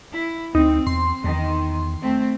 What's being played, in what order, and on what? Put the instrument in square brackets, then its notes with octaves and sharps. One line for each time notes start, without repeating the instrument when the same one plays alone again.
[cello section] E4
[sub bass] D2 [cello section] C4 [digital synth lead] D#4
[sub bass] E2 [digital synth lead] C6
[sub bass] E2 [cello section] D#3
[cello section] A3 C4